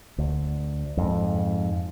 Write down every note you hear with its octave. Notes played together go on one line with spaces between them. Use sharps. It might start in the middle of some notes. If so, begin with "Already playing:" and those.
D2
F2 G#2